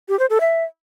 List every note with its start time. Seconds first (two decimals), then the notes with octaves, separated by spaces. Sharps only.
0.09 G4
0.19 C5
0.30 A4
0.41 E5